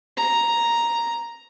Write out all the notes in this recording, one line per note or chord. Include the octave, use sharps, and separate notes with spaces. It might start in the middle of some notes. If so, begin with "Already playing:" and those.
A#5